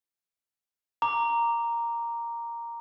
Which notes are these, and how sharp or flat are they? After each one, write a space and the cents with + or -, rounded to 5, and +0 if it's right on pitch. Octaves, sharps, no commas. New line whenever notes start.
A#5 +0 D6 +0